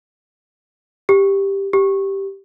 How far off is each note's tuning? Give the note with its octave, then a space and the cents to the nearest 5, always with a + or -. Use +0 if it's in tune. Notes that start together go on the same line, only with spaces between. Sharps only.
G4 +5
G4 -5